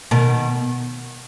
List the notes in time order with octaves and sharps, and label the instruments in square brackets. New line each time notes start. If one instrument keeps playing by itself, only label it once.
[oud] B2 D#3